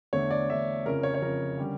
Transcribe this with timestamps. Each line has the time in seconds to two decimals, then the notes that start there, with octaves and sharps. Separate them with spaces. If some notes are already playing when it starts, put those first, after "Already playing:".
0.13 E2 D3 A3 C#5
0.31 D5
0.49 E2 D3 A3 E5
0.86 F2 C#3 F3 C#4 A#4
1.03 C#5
1.14 C#5
1.22 F2 C#3 F3 C#4 A#4
1.57 D3 G3 C#4